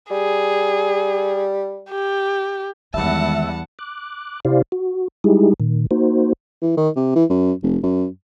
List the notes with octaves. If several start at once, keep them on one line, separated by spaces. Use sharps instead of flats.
G3 G#4
G4
E2 D#3 G3 G#3 E5 F#5 A5
D6 F#6
C3 E4 G4 C5 D5 F5
F#4
G3 G#3 D#4 E4 G4 G#4
A#2 D#3
A#3 D#4 F#4 C5
E3
D#3
C3
E3
F#2
F1
F#2